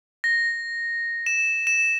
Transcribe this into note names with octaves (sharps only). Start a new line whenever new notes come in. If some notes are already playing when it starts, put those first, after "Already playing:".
A#6
E7
E7